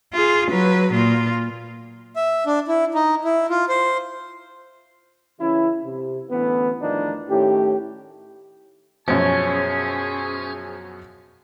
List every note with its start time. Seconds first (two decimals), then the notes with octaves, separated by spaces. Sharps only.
0.13 F4 G#4
0.51 F#3 B4
0.93 A#2 F4
2.16 E5
2.46 D4
2.68 E4
2.94 D#4
3.25 E4
3.50 F4
3.69 C5
5.40 C#3 E3 C#4 E4
5.84 C3
6.30 A1 D3 E3 B3
6.81 E2 A2 D#3 F3 D4 D#4
7.29 A2 D#3 C#4 G4
9.08 F#2 B2 F3 C#4 G#4 C5 G#5